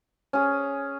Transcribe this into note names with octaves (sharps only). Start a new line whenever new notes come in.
C#4 G#4